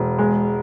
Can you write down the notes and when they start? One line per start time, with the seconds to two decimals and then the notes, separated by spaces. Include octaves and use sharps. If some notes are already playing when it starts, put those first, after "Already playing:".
Already playing: E1
0.18 G#3